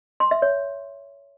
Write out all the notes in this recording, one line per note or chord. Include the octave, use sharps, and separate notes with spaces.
C6
E5
C#5